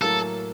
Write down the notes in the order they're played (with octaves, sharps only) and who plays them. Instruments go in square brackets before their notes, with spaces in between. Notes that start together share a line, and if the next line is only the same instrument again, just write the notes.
[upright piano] A2 F#3 A#3 [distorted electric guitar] A4